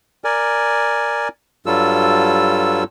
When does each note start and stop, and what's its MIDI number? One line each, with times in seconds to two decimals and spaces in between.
0.24 1.28 70
0.24 1.28 74
0.24 1.28 80
1.66 2.84 43
1.66 2.84 54
1.66 2.84 55
1.66 2.84 65
1.66 2.84 69
1.66 2.84 88